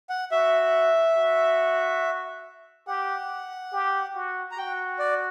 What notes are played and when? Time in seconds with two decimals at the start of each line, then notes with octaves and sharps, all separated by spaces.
0.10 F#5
0.31 F#4 E5
1.17 F#4
2.87 G4 F#5
3.72 G4
4.15 F#4
4.51 A#5
4.57 F#4 G5
4.99 D5